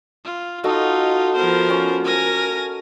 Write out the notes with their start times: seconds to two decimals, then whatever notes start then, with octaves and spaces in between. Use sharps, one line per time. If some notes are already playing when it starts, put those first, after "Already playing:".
0.24 F4
0.64 D#4 F4 F#4 A4 D#5
1.36 F3 B3 A#4 C5
1.70 C#4
2.04 A#4 G#5 A#6